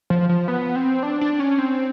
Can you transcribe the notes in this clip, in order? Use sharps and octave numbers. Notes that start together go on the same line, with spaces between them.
F3
F3
B3
C4
D4
D4
C#4
C4